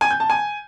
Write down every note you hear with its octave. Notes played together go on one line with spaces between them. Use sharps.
G#5
G6
A5
G#5